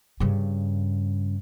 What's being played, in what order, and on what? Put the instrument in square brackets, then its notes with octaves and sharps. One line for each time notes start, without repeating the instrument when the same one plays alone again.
[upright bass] G2 C#3